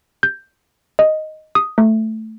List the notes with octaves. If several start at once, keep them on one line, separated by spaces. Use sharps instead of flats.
G6
D#5
D#6
A3